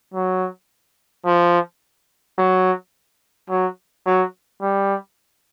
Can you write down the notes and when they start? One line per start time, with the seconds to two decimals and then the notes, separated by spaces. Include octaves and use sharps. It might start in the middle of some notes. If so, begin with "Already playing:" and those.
0.14 F#3
1.25 F3
2.38 F#3
3.50 F#3
4.06 F#3
4.62 G3